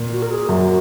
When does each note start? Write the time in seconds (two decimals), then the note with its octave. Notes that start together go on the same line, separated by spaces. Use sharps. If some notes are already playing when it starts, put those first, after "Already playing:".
Already playing: A#2
0.13 F#4
0.22 A#4
0.31 G#4
0.49 F#2 F#4